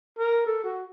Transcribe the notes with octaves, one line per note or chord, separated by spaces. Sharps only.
A#4
A4
F#4